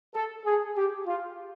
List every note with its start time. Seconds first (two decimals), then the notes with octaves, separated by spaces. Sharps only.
0.14 A4
0.44 G#4
0.76 G4
1.06 F4